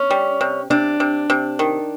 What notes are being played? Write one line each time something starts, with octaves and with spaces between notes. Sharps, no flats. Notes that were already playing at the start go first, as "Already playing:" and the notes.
Already playing: C#4
G3
C3
C3 D4
C3
C3
D#3